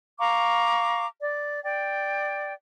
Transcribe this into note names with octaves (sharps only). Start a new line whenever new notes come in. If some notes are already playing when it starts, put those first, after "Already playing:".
F5 A#5 C#6 D6
D5
D5 G5